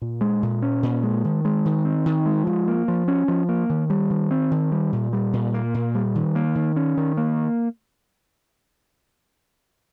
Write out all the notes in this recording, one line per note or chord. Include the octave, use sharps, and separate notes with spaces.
A#2
G#3
A#2
C#4
A#2
G#3
D#3
G#3
D#3
C4
D#3
G#3
F3
A#3
F3
C#4
F3
A#3
D#3
G3
D#3
C4
D#3
G3
A#2
G3
A#2
A#3
A#2
G3
D#3
A#3
D#3
C#4
D#3
A#3